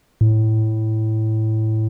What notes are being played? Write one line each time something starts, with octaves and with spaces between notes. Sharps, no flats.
A2